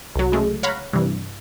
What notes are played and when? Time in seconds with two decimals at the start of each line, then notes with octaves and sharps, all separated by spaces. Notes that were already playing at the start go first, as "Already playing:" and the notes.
0.16 C2 F#3
0.32 C#3 G#3 A3
0.63 C#5 F5 F#5 A#5 B5
0.93 G2 C3 E3